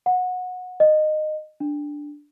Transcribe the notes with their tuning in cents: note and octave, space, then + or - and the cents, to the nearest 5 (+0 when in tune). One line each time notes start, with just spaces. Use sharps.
F#5 -20
D#5 -15
D4 +0